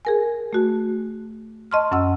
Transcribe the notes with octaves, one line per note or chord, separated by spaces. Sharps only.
G#4 A#4 G#5
A3 F#4
D#5 A5 C6 C#6 F6
F#2 C#4 F#5 E6